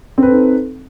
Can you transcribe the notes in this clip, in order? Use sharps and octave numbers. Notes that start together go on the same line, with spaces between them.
C4 D#4 A4 B4